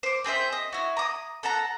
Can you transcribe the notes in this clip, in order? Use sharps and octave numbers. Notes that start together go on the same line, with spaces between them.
C5 D6
C4 G#4 C5 E5
D#5
E4 F#4
A#5 D6 D#6
A4 F#5 A5 A#5